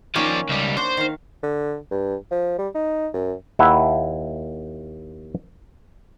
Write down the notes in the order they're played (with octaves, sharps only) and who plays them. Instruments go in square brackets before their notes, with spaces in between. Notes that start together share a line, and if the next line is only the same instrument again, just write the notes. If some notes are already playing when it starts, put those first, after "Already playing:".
[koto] D#3 A#3 C#4 [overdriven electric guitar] F3 D5
[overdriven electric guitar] C#2 G3
[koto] D4 F#4 [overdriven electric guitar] C5
[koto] D#3 F5
[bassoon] D3
G2
F3
G3
D#4
F#2
[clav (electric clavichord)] D#2 E4 E5 F#5